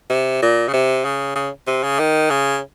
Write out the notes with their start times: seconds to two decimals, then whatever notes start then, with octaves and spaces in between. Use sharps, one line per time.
0.10 C3
0.42 A#2
0.69 C#3
0.73 C3
1.05 C#3
1.36 C#3
1.67 C3
1.83 C#3
1.99 D#3
2.30 C#3